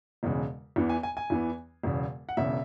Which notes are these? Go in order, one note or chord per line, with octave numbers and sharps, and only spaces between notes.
E1 E2 C#3 G#3
E2 E3 B3
G#5
G#5
G#5
E2 E3 B3
E1 E2 C#3
F#5
E1 E2 C#3 E5